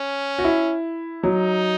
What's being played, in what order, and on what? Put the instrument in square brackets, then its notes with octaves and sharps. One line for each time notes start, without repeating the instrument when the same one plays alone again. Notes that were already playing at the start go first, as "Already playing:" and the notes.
Already playing: [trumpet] C#4
[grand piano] F#4
E4
[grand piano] F#3 [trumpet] D#4